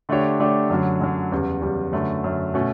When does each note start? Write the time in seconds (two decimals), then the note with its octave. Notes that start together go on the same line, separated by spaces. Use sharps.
0.09 D3 A3 D4 G4 C#5
0.40 D3 A3 D4 G4 C#5
0.70 F#2 D3 F#3
1.01 F#2 D3 F#3
1.32 E2 C#3 G3
1.62 E2 C#3 G3
1.93 F#2 D3 A3
2.24 F#2 D3 A3
2.54 B2 A3 C#4